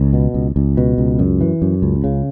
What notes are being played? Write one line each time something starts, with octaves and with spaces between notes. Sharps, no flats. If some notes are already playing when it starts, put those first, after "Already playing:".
Already playing: C#2
B2
C#2
C#2
B2
C#2
F#2
E3
F#2
C#2
C#3